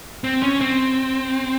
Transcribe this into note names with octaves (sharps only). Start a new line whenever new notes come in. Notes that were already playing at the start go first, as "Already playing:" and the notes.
C4
C#4
C4